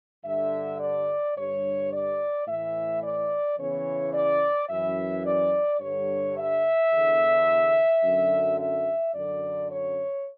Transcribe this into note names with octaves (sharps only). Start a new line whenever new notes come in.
G2 D3 E5
D5
G2 D3 C#5
D5
A2 E3 E5
D5
E2 C#3 E3 C#5
D5
F#2 E3 E5
D5
G2 D3 C#5
E5
E2 D3
F#2 D3
E5
F#2 D3 D5
C#5